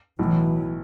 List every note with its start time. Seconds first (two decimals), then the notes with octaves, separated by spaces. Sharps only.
0.19 B1 A2 E3 F#3